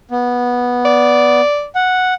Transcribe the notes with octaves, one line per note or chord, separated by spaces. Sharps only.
B3
D5
F#5